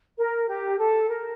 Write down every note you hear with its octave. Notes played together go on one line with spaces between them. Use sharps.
A#4
G4
A4
A#4